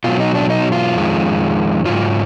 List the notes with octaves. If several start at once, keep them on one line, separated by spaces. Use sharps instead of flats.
B2 F#3 F4
D#4
D4
D#4
F4
F2 D#3 G#3
G#2 F#3 F4